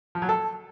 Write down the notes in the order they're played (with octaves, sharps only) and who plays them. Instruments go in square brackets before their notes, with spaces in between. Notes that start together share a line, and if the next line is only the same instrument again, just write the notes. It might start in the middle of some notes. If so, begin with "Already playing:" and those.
[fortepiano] F3
F#3
A4